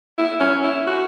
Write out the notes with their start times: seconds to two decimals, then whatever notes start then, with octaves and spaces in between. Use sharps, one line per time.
0.18 E4
0.40 C#4
0.63 E4
0.87 F#4